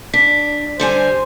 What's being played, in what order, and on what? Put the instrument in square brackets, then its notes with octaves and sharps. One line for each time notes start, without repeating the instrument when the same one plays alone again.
[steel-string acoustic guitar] D4 [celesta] B6
[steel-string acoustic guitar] D3 G3 G#5 [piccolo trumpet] C5